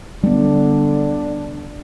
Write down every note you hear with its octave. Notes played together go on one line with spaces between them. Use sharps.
D3 G3 B3 D4